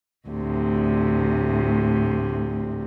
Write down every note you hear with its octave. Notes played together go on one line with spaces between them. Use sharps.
D2 A2 C3